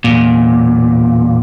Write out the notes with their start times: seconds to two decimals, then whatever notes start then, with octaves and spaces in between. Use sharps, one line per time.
0.04 E2 A#2